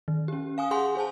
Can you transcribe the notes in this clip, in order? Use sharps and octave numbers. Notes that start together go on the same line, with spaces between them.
D#3
C#4 G4
F5 G#5 D#6
G#4 F#5 G#5 C6
G#4 C5 G#5 A5